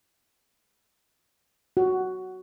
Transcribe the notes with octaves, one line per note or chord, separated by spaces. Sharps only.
F#4